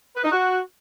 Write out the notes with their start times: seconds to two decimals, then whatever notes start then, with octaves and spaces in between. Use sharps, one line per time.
0.16 B4
0.24 D#4
0.32 F#4